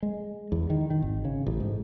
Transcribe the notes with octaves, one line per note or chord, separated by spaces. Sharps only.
G#3
E2
D#3
D#3
G#1
C#3
A1
G#2